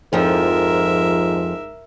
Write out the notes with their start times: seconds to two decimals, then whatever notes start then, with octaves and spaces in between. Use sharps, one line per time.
0.13 F2 G#2 F3 A#4 D#5 E5